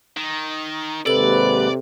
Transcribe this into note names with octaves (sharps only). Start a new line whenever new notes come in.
D#3
D#2 G#2 C3 A4 B4 D5 F#7